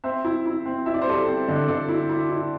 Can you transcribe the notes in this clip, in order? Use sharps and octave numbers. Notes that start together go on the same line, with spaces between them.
C4 C5 E5
E4
E4
C4
E4 E5
D5
C5
G3 A4 D5
C4
D3
D3 A4 D5
E4
E4
E4